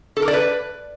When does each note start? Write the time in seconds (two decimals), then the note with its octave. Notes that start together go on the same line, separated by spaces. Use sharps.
0.17 A4
0.22 A#4
0.28 D5
0.33 B4